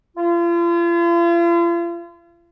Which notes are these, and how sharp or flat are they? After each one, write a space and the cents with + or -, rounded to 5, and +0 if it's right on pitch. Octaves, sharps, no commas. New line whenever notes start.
F4 -40